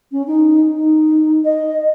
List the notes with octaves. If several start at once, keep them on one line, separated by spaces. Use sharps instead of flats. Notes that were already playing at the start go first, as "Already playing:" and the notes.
C#4
D#4
D#4
D#5